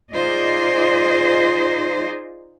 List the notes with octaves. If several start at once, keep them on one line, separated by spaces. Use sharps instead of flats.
D#4 F4 G#4 C5 D5 D#5